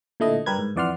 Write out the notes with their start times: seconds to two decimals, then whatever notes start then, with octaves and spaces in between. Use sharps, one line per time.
0.20 A#2 D3 A3 E4 D#5
0.46 G2 G3 G4 A#4 B4 G#6
0.59 G#2
0.76 F2 E3 D5 F#5 C6 F6